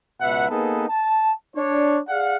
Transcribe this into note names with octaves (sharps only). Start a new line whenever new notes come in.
C#2 B2 B4 E5 F#5
A#3 B3 D#4 G#4 A4 B4
A5
D4 C#5
G#4 D5 F5 F#5